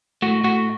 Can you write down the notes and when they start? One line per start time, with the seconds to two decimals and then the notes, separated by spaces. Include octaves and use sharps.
0.22 A2 A3 F#4
0.44 A2 A3 F#4